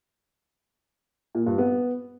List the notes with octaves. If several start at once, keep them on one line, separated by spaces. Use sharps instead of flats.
A#2
G2
B3